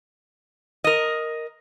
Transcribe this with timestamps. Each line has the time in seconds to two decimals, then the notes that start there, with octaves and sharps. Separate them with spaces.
0.84 A#4 D#5